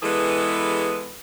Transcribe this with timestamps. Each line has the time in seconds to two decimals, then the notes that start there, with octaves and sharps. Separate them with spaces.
0.02 E3 G#3 B3 G#4 A4 B4